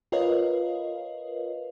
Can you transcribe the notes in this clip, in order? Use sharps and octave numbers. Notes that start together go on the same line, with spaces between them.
F4 A#4 B4 C#5 D#5 F5